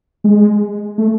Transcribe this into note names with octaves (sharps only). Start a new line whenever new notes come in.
G#3
A3